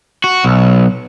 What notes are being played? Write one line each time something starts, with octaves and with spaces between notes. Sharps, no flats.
F#4
B1